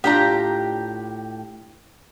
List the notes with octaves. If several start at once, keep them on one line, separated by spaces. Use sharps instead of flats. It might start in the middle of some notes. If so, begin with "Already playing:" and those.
A2 D4 F4 G4 A#5